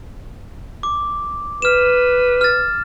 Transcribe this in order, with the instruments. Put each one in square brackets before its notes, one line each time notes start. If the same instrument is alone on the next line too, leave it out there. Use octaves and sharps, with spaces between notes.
[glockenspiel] D6
[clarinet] B4 [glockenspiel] F6 E7
[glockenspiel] F6 A6